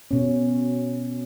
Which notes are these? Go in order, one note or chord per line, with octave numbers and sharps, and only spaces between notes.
B2 C#4